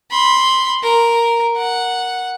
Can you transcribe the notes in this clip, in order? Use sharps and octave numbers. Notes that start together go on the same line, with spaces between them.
B5 C6
A#4
F#5